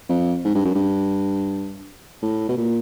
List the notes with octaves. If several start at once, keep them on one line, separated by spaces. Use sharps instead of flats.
F2
G#2
G2
F#2
G2
A2
B2
A#2